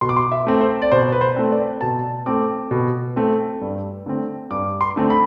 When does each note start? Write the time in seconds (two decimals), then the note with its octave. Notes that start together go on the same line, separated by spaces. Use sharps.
0.01 B2 C6
0.09 D6
0.17 C6
0.32 E5
0.47 A3 C4
0.61 C5
0.82 D5
0.92 B2 C5
1.12 B4
1.21 C5
1.36 A3 C4
1.51 D5
1.81 B2 A5
2.26 A3 C4 D6
2.71 B2
3.16 A3 C4
3.61 G2
4.06 D3 A3 C4
4.51 G2 D6
4.81 C6
4.96 D3 A3 C4
5.10 B5